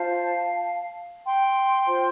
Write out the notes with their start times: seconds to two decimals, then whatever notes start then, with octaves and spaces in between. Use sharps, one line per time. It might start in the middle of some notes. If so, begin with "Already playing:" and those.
Already playing: F4 C5 F5 A5
1.26 G5 C6
1.85 F4 C5